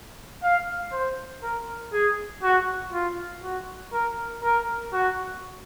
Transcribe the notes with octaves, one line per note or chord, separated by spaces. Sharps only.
F5
C5
A#4
G#4
F#4
F4
F#4
A#4
A#4
F#4